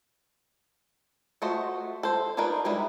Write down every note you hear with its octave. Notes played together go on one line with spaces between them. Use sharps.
A3 F4 F#4 C5 D#5
A4 C5
D4 D#4 F4 A#4 B4
G3 G#3 D#4 E4